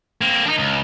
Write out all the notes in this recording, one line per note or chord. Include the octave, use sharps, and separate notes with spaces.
A#3 C4
D4 D#4
C#2